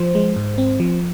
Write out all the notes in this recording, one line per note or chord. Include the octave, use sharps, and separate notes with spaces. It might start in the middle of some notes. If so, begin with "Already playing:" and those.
Already playing: F3 C5
G#3
G#2
C4
F3